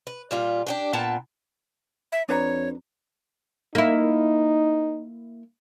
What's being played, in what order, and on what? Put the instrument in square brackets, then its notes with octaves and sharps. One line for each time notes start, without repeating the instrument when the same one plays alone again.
[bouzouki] B4
A#2 G3 F4
D4 G4 B4
A#2 B3 G5 A5
[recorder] E5
[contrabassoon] F2 [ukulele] D4 B4 A#5 [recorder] C#5
[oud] A#3 E4 [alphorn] D#4